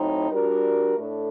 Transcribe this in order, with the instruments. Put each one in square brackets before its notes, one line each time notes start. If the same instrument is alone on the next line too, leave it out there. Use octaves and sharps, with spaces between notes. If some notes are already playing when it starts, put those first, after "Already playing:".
Already playing: [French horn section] A2 F#3 C4 D#4
G3 D4 F#4 A#4
A2 A3 D4 A4